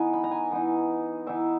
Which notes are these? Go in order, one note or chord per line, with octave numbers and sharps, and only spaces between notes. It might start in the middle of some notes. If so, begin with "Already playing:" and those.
Already playing: E3 B3 D#4 G#5
B5
A#5
G#5
E3 B3 D#4
E3 B3 D#4 E5